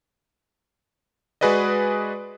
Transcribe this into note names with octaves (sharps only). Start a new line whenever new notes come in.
G#3 F#4 G#4 B4 D5 D#5